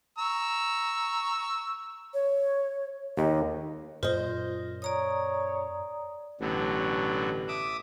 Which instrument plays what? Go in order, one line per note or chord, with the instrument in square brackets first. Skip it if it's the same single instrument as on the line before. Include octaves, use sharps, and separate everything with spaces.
[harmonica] A#5 C#6 E6
[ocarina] C#5
[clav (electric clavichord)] D#2 [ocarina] D#5
[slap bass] F#2 A#2 [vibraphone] F4 [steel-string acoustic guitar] C5 D#5
[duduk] C#5 [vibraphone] D5 A#5 D#6
[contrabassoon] A1 [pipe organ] B2 D3 F#3
[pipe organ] E5 D6 D#6